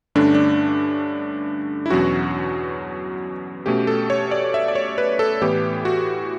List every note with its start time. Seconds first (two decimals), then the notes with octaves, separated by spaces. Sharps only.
0.15 G2 D3 A3 C#4 D4
0.35 D4
1.86 E4
1.90 E2 B2 F#3 C#4 F#4
3.66 B2 A3 C#4 G4
3.87 A4
4.10 C#5
4.31 D5
4.54 E5
4.68 D5
4.75 C#5
4.98 B4
5.19 A4
5.42 A2 E3 B3 G4
5.85 F#4